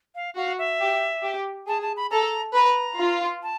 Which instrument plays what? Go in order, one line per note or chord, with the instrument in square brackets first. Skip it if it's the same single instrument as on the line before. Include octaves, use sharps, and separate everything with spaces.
[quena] F5
[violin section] F#4 [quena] F5
[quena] E5
[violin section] G4
G4
[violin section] G#4 [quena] A5
[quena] A5
B5
[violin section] A4 [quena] A#5
[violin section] B4 [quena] A#5
[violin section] F4
[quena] A5